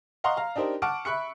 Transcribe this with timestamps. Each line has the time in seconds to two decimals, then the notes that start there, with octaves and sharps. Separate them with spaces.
0.24 D#5 F5 F#5 A#5 C6 C#6
0.37 F5 A#5
0.56 D4 D#4 G4 A#4 C5
0.82 F#5 A5 C#6 D6 F6 D7
1.05 E5 B5 C#6 F#6 C#7